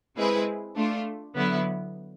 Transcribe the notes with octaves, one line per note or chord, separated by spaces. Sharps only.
G#3 C4 E4 G#4 B4
A3 D4 F4
D3 F#3 B3 E4